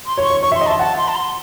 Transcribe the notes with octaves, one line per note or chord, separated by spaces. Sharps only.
C6
C#5
C#6
C#5
C#5 C#6
E5 C6
D#5
E5 A5
F#5 A5
C6
A5
C6